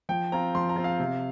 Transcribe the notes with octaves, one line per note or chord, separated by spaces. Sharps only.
F3 G5
C4 F4 A#5
F3 C6
A#5
C4 F4
F5
C3